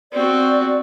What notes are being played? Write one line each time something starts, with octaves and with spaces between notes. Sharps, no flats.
C4 F#4 D5